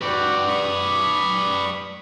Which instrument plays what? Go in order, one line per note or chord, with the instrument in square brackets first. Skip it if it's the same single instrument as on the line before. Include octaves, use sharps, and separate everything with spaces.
[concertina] F#4 F#5 G5 [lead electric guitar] B4 D5
[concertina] B5 C#6 D#6